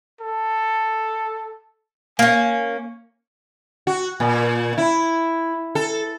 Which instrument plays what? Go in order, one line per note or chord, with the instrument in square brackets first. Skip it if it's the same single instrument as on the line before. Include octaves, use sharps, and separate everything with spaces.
[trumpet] A4
[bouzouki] A#3 C#4 [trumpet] G#5
[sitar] F#4
A#2
E4
A4